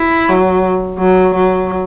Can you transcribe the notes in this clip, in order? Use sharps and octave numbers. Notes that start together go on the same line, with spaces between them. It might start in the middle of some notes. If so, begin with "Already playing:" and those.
Already playing: E4
F#3
F#3
F#3